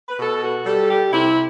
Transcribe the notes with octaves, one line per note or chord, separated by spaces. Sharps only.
B4
B2 A4
F#4
G3 A4
G4
C3 E4